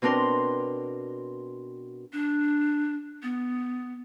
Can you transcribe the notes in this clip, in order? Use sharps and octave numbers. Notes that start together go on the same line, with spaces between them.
B2 C4 D4 A#4 C6
D4
B3